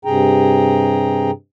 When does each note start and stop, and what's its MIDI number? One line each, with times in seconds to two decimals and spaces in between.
0.05 1.31 43
0.05 1.31 48
0.05 1.31 68
0.05 1.31 79
0.05 1.31 82